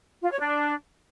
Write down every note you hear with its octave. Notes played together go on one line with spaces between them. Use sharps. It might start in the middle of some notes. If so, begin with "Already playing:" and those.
F4
C#5
D4